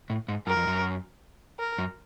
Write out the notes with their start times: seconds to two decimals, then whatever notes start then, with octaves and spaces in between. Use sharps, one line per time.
0.10 A2
0.28 G#2
0.47 F#2 A#4
0.57 F2
0.67 F#2
1.59 A#4
1.78 F#2